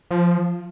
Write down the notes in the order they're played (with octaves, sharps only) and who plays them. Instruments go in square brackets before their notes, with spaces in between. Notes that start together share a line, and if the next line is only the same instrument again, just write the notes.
[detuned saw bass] F3